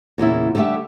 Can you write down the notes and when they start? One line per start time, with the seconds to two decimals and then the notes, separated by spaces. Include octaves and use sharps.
0.18 E2 A#2 C#3 E4
0.55 D3 G3 A3 G4 E5